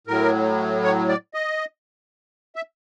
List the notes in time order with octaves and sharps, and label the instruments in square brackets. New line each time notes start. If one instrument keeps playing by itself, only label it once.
[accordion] A2 F#3 A#4
C#5
D5
D#5
E5